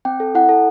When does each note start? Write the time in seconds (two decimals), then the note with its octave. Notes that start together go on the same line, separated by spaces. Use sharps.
0.05 C4 G5
0.20 A4
0.35 E4 F#5
0.49 A4